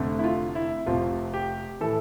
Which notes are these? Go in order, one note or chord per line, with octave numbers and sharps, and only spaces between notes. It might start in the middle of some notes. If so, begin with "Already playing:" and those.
Already playing: F1 F2 D3 A3
E4
F4
E4
F1 F2 C3 F3 F4
G4
A2 E3 A4